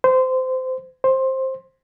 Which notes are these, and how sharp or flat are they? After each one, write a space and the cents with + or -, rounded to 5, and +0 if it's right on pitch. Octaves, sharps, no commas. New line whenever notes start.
C5 -20
C5 +15